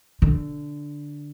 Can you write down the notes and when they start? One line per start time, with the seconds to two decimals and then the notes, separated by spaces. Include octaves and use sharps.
0.22 D3